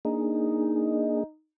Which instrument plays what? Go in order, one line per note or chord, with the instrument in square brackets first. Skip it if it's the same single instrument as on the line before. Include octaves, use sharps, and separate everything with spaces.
[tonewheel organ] A#3 D4 G#4 [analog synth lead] D#4